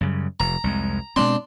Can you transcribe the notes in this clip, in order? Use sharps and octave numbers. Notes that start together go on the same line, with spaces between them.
F#2 C#3 G3
F1 A#5
C2 F2 G#3
B2 G#3 C4 D4 C6